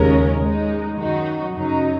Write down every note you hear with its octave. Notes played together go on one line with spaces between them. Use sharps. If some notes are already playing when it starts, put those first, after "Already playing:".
Already playing: D#2 C#3 G#3 C#4 A#4
G#2 G#3 D#4
F#2 D#3 F#3 D#4 F#4
F#2 C#3 F#3 D#4